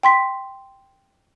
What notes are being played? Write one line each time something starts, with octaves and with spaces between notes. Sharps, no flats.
G5 C6 B6